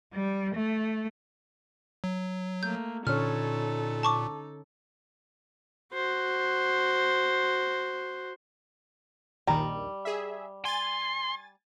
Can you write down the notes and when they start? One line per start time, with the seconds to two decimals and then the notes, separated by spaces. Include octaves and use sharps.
0.14 G3
0.55 A3
2.04 F#3
2.63 A3 A#3 G6
3.07 A#2 D3 C#4 D#4 A4 C#5 F6
4.03 A5 C#6 D6
5.93 F#4 C5
9.47 A#1 D#2 D#3 G3 A#5
10.05 G#4 E5
10.65 G#5 C6 A6